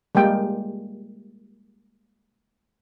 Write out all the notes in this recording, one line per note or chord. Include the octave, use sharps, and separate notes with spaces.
G3 G#3 A#3 G5